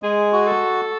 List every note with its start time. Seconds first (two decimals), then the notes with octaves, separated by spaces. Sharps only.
0.03 G#3 G#4
0.33 F#4
0.47 A4